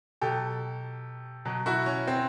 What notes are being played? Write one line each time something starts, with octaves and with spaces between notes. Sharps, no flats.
B2 F#3 G4 A4
B2 F#3
E4 F#4
C#4
C4